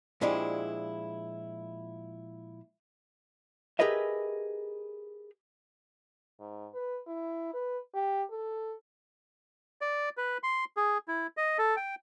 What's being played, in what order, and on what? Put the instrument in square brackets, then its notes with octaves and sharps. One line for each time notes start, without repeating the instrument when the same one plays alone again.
[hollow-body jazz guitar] A#2 F3 G#3 D4 E4 G4
G4 G#4 A#4 B4 D#5 E5
[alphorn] G#2
B4
E4
B4
G4
A4
[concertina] D5
B4
C6
G#4
E4
D#5
A4
G5